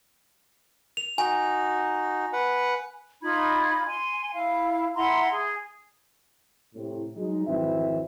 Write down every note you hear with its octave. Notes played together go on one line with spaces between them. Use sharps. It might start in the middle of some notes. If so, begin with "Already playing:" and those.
F7
D#4 F#4 G#5
B4 F#5
D#4 F4 B5 G#6
G#5 C6
E4 F5
E4 F#5 A#5 C6
G#4
A2 C3
F#3 G#3 D#4
G#1 F2 E3 C4 E5